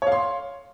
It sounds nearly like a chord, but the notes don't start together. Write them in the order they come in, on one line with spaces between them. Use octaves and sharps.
C#5 F5 C6